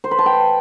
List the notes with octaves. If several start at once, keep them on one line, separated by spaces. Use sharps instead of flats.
C5
B4
A5
G5